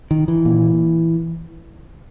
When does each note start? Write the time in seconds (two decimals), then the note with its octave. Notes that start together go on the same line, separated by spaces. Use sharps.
0.11 D#3
0.28 E3
0.45 A#2